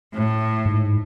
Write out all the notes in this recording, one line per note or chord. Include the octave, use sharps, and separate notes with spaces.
A2
G#2